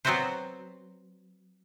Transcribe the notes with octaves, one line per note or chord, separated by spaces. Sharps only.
F#3 B3 C4 F#4 B4 C5